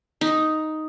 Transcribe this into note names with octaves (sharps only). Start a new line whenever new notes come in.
D#4